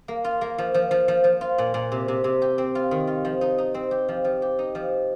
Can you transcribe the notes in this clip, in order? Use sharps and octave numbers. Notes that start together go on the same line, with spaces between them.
A#3
F4
A#3
F3
F3
F3
F3
F3
F4
A#2
A#2
C3
C3
C3
G4
C4
F4
D#3
F4
F3
D#4
D#4
C4
G4
F3
F3
G4
D#4
F3